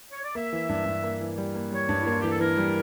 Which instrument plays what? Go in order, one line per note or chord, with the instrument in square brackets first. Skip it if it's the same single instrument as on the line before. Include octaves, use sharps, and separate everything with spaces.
[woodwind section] C#5
D5
[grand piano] A#3 [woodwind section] E5
[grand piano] E3
G2
G2
A#3
E3
G3
A#3
[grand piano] G3 [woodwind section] C#5
[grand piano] G2
[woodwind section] E4
[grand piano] A#3 [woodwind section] F4
[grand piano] E3 [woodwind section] G4
[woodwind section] A4
[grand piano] E3 [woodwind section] A#4
[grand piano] G3